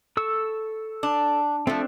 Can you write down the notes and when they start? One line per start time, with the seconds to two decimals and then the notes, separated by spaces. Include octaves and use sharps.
0.17 A4 C#6 E6
1.03 D4
1.67 F3 A3 C4 D4